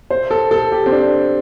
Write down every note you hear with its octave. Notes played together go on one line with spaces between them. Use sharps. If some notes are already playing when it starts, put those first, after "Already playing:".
C5
A4
A4
G4
C4
D4